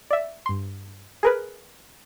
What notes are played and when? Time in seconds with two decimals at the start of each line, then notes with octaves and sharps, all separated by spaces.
0.11 D5 E5
0.46 G2 C6
1.23 G#4 A#4 B4